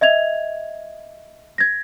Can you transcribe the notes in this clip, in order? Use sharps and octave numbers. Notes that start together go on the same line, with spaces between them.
D#5 E5 G#6 F7
G#6 A#6